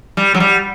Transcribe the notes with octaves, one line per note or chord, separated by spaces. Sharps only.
G3
F#3
G3